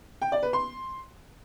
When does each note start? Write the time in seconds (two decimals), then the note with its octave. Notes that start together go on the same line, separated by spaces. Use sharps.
0.22 G5
0.32 D5
0.43 B4
0.53 C6